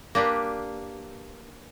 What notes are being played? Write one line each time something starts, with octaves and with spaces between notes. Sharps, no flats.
A#3 D4 G4 B4